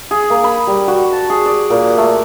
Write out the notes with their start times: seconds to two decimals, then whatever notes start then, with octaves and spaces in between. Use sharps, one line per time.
0.11 G#4
0.30 A#3
0.44 B5
0.67 G3
0.88 F#4
1.13 A5
1.30 G#4
1.46 D5
1.70 A#2
1.98 A3